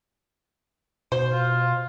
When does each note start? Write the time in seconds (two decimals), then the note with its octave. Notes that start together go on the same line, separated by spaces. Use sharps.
1.12 B2 C5
1.32 F4